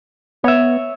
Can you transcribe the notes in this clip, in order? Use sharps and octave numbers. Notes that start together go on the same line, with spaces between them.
B3 C#5 E5